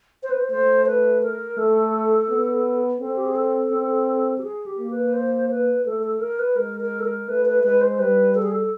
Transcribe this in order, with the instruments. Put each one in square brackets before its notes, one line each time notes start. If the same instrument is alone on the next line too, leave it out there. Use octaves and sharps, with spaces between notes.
[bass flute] C5
B4
C5
[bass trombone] A3 [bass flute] C5
[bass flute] B4
A#4
[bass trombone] A3 [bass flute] A4
[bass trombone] B3
[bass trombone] C4 [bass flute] A4
[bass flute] G4
G#4
A4
[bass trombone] C4
[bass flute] G4
G#4
G4
[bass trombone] A#3
[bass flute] B4
C5
B4
[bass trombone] A3 [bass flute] A4
[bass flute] A4
A#4
B4
[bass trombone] G#3 [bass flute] A#4
[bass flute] A#4
A4
A#4
[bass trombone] A3 [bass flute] B4
[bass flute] B4
[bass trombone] G#3 [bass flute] B4
[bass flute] C5
[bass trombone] G3 [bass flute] B4
[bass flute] A4
G#4
A4